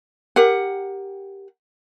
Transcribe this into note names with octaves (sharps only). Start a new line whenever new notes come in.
G4 A#4 F#5